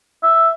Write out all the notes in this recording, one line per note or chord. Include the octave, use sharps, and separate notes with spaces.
E5